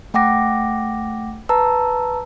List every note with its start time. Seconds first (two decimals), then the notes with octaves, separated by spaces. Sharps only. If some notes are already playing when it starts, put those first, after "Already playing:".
0.14 A3 F#5 G5 D6 A#6
1.49 B4 A5 A#5 E6